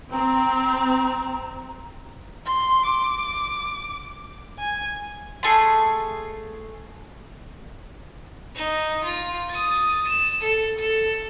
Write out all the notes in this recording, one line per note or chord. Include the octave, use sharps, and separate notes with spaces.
C4 A#5
C6
D6
G#5
A3 G#4 A5 C6
D#4
F4
D#6 A6
E7
A4
A4